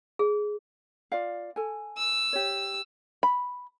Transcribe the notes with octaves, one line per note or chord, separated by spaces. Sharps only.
G#4
F4 D5 F5
A4 G#5
E6
G4 C#5
B5